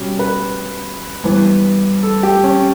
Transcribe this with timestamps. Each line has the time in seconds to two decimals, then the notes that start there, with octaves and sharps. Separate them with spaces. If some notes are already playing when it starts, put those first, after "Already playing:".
Already playing: B2 G3 C#4
0.19 B4
1.24 G2 E3 B3
2.03 A4
2.23 G4
2.44 C#4